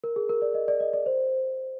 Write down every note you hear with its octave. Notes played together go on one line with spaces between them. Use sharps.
A#4
G#4
A#4
D5
D#5
D5
D#5
D5
C5